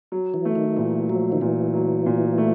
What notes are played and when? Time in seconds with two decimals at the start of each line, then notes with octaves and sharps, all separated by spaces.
0.12 F#3
0.34 E3
0.45 A3
0.55 D#3
0.77 A#2 E3
1.09 F3 F#3
1.32 D#3
1.41 A#2 E3
1.74 F#3
2.06 A#2
2.38 A3